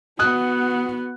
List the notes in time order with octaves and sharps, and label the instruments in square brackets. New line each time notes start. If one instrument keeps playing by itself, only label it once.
[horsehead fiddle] B3 F#4 [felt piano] D#6 F#6